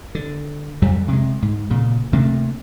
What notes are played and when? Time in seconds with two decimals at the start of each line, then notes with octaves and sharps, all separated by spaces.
0.15 D3
0.82 F2 F#3 G3
1.08 C3 G#3
1.42 G#2
1.70 A#2 C#3
2.12 D2 C3 A3 A#3